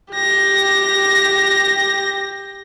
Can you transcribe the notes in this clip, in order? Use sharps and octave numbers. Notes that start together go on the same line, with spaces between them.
G4 A#6